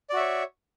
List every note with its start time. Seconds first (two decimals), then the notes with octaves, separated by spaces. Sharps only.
0.10 D5
0.13 F#4
0.16 E5
0.20 C#5